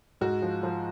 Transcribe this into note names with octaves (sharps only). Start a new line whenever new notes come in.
G#2 F#4
F3
F3